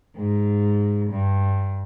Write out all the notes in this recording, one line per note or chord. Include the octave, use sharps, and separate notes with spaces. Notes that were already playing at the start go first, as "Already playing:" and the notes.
G#2
G2